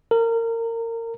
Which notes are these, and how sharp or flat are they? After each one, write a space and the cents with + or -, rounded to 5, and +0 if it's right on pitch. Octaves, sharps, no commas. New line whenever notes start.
A#4 -25